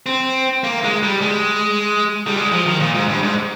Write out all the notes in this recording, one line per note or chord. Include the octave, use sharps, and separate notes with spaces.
C4
A#3
G#3
G3
G#3
G3
G#3
F3
D#3
A#2
G#2
G2
G#2